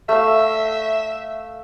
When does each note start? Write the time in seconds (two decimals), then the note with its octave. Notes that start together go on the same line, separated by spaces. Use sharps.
0.09 A3 E5 F5